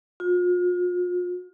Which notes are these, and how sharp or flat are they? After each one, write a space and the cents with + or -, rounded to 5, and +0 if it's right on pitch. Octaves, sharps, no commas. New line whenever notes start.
F4 +40